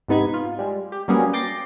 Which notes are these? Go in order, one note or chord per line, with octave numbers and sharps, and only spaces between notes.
G#2 C3 B3 D#4 B5 G#6
F4
G3 G#3
G4
F#3 G3 A#3 B3 C#4 G#4
G5 D6 G6 A6 A#6 C7